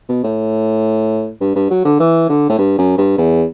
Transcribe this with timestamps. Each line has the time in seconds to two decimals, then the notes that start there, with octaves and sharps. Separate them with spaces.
0.09 B2
0.24 A2
1.41 G2
1.55 G2
1.70 F#3
1.85 D3
2.00 E3
2.29 D3
2.49 A2
2.58 G2
2.79 F#2
2.98 G2
3.18 E2